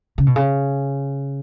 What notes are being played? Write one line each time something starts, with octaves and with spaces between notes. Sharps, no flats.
C#3
B2
C#3